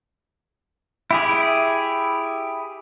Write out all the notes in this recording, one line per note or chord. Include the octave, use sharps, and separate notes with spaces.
E4 G4 G#4